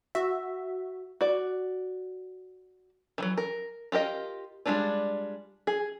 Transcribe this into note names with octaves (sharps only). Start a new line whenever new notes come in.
F#4 E5
F#4 D5
D#3 E3 F#3
A#4
F4 G4 A#4 D#5
G3 G#3 C#4 D4 F4
G#4